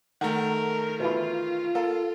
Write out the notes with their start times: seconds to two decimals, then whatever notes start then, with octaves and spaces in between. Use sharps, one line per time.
0.21 D#3 A3 A#4 F#5 A#5
1.00 B2 E3 F4
1.75 A#3 A4